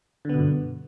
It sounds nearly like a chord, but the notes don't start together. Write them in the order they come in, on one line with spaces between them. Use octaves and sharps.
D3 B3 B2 G2